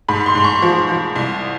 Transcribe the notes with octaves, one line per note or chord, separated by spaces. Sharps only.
G#2 B5
C6
G#2
C#6
F3
F3
C2